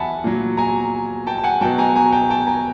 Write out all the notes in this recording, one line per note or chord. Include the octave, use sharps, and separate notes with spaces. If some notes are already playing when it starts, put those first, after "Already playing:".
Already playing: E2 F#3 E5 F#5 G#5 A5 B5
A#2 F#3
G#5 A#5
G5 A5
A5
F#5 G#5
B2 F#3 G5 A5
G#5 A#5
G#5 A#5
G5 A5
G5 A5
G#5 A#5